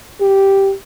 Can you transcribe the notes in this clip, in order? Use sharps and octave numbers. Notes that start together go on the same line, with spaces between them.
G4